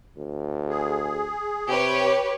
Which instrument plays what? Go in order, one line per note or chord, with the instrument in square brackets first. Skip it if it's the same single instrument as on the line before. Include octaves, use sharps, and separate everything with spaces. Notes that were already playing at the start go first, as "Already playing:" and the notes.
[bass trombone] D2
[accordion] G#4
[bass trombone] C3 [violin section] G4 B4 C#5